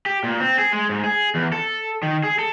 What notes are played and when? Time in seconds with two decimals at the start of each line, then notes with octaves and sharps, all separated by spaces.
0.06 G4
0.24 A#2
0.40 C4
0.58 G#4
0.73 G#3
0.89 G#2
1.04 G#4
1.35 E2
1.52 A4
2.03 D#3
2.23 G#4
2.39 A4